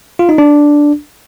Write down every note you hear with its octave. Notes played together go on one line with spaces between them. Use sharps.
F4
D#4
D4